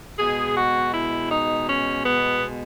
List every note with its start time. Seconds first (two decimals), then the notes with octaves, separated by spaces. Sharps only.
0.19 B2 G#3 G#4
0.56 F#4
0.93 E4
1.31 D#4
1.69 C#4
2.06 B3